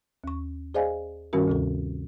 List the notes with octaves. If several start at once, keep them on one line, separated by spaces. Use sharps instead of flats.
D#2 C#6
G#4 C5 D5 D#5 F5 G#5
G2 D#3 G3 C#4 F#4 A#4
D2 C3 A4